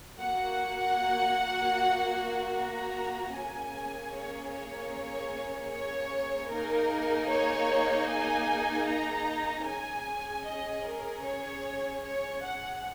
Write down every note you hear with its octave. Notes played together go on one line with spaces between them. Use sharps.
A#3 F#4 F#5
A#5
A#3 C#4 G#4 G#5
C#5
C#5
C#5
A#3 D#4 G#4 A#4
C#5
G#5
A#5
C#4 G#4 G#5
D#5
A#4
C#5
C#5
F#5